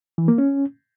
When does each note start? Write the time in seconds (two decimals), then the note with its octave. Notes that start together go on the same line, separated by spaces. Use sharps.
0.18 E3
0.28 A#3
0.38 C#4